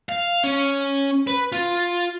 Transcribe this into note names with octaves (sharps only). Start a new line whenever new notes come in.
F5
C#4
B4
F4